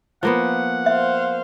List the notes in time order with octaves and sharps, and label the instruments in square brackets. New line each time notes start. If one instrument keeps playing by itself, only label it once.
[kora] F3 A#3 B3 [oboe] F#5
[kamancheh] C5 F5 [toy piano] E5